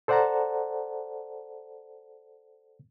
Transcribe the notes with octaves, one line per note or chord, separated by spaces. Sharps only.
A4 C5 D5 F#5 A5 A#5